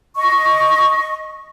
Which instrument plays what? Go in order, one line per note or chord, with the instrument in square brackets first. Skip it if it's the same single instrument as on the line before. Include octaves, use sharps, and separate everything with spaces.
[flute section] D#5 C#6